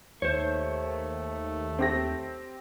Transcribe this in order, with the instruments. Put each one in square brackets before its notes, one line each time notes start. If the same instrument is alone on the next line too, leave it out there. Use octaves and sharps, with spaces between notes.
[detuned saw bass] D#2 [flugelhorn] A3 [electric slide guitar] C5 C#5
[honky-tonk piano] C4 G4 A#6